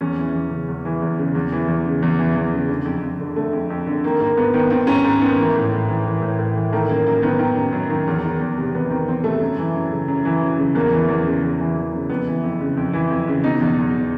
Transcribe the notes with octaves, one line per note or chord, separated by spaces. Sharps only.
E2 C#4
E3
E2
C#3
E2
E3
E2
C#3
E2
E3
E2
C#3
E2
E3
E2
C#3
D3
F2
F2
D3
D3 A3
F2
F2
D3
D#3 A#3
G#2 A#3
G#2 B3
D#3 B3
D#3 C4
G#2 C#4
G#2
D#3 B3
E3 A#3
A2
A2
E3
E3
A2
A2
E3
D#3 A3
F#2 A#3
F#2 A#3
D#3 B3
D#3
F#2
F#2
D#3
E2
D#3
E2
C3
E2 B3
D#3 C4
E2 C4
C3 A3
F#2
E3
F#2
C#3
F#2
E3
F#2
C#3
E2 A#3
E3
E2
C#3
E2
E3
E2
C#3
F2 B3
E3
F2
C#3
F2
E3
F2
C#3
B2 D#4
E2
E2
B2